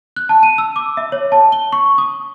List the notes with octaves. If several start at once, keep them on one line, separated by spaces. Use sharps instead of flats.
F#6
A5
D#7
E6
D6
E5
C#5
A5
G7
C#6
D#6